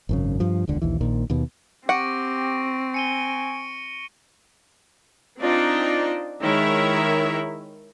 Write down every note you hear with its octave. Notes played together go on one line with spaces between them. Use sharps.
G#1 F#2 C#3
G2 F3
E1 C#2 D3
A#1 D#2 E3
A#1 A#2 D#3
D#2 B2
C4 G4 F#5 C#6 A#6 D7
G#5 C#7 D#7 G7
C4 D4 D#4 F4 D5 D#5
D#3 G#3 E4 A#4 C#5 E5